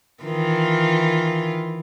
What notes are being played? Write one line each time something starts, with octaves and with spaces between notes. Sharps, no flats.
D#3 E3 F4